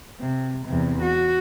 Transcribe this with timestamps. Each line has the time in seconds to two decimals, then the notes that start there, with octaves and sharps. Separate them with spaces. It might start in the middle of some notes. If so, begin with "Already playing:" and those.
0.21 C3
0.66 E2 C3
1.02 F#4